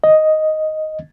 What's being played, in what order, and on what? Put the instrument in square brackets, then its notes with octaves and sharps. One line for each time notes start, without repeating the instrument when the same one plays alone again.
[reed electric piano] D#5